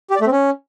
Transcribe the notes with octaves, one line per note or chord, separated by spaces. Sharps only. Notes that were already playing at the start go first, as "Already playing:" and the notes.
G4
D5
A3
C4
C#4